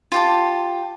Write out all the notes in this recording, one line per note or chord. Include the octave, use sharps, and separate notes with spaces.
F4 G4 A5